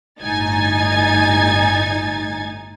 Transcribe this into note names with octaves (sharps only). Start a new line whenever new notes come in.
G1 A2 D#4 G#5 G#6 A6